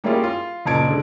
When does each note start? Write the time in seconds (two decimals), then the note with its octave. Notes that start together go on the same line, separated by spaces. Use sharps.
0.04 G3 A#3 C#4 E4 F4 G#4
0.23 F4
0.65 F#1 A#2 C#3 A5 G#6 D7
0.87 D3 G#3